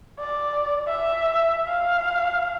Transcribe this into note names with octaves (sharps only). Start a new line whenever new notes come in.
D5
E5
F5